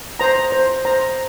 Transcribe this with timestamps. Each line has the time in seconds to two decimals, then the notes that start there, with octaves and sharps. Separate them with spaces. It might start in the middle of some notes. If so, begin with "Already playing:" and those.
0.20 C5 A#5
0.52 C5
0.85 C5 A#5